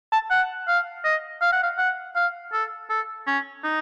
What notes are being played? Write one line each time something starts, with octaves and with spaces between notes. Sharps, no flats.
A5
F#5
F5
D#5
F5
F#5
F5
F#5
F5
A4
A4
C#4
D#4